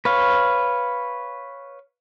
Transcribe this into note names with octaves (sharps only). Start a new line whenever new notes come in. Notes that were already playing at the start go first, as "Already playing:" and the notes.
B4 C#5 F5